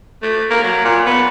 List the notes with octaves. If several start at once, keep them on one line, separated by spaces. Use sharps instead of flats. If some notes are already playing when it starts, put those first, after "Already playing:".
A3
A#3
F#3
A#2
B3